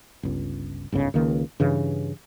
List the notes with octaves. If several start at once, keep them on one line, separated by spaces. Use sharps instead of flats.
G1 C#2
G1 C#2 G#2 C#3
C#2 D#3 A#3
G2 C#3 E3